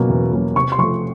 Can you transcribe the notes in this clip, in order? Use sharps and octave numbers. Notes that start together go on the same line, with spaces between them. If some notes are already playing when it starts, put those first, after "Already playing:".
Already playing: B2 F#3 A#3 C#4
E2
B2 F#3 A#3 C#4
C3 C#6
C6
F3 A3 C#6